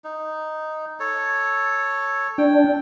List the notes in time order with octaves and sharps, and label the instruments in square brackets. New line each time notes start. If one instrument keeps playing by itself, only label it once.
[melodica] D#4
A4 C#5
[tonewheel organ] D4 [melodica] G5